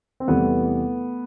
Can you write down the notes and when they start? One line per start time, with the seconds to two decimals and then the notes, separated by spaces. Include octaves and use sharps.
0.20 C4
0.28 E2 C3 E3 G3 A3 B3